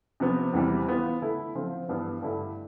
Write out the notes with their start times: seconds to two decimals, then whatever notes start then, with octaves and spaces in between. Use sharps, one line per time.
0.20 C3 F3 B3
0.53 E2 C3 E3 G3 C4
0.88 E3 B3 F4
1.22 D3 A3 E4
1.55 D3 F3 C4 F4
1.88 G2 E3 B3
2.22 G2 D3 A3 E4